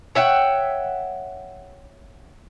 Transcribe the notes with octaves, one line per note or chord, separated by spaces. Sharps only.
C#5 E5 F#5 G5